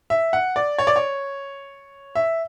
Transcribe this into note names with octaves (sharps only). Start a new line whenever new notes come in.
E5
F#5
D5
C#5
D5
C#5
E5